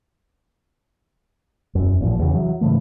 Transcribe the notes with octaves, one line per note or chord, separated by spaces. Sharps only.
E1 F#2
A1 A#2 D3 F3
E2 C#3
E3 F#3
G#2 C#3 E3 A3